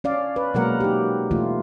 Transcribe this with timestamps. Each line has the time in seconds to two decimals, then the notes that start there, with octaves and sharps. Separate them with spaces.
0.04 C#4 D5 F5
0.36 B4
0.54 B2 F#3 G#3 A#3 A#4 F#5
0.80 D#4 G4
1.31 B2 E3 A3 F4